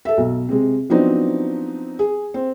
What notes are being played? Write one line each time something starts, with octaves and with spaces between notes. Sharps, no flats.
A4 E5
B1
C3 G#3
F3 F#3 B3 C4 D4 D#4
G#4
C4